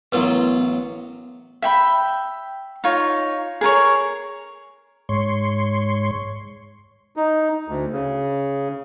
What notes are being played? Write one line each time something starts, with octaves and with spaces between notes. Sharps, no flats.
A1 F#3 B3 E4 F4 A#4 B4
E5 G5 B5
D#4 F4 C#5
G#4 A#4 B4 C#5
G#2 C#5 C6
D#4
D2
C#3